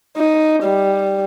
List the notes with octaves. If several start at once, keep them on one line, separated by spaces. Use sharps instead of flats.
D#4
G3